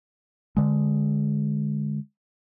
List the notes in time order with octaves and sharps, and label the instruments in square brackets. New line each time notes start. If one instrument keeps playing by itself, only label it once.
[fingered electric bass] D3 G#3